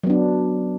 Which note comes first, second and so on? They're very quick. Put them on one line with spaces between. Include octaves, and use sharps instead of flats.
F#3 B3 D4